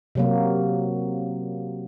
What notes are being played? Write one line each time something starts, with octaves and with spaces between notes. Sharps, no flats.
C3 F#3 A#3